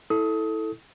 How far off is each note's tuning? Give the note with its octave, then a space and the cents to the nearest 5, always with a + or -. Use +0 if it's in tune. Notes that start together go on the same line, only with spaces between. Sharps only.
E4 -20 A4 +0 D#6 +25